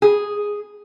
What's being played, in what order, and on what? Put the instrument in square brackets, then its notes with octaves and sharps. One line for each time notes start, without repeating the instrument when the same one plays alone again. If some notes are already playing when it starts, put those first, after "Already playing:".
[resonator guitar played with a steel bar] G#4